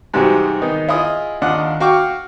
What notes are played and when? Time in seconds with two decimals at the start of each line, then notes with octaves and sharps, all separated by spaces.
0.14 G#2 C3 E3 G3 F#4 G#4
0.62 D#3 B3 D#4
0.89 E4 F4 G#4 D#5 D#6
1.42 D#2 D4 F4 D#5 F#5 F#6
1.80 F#4 F5 G5 C#6 D6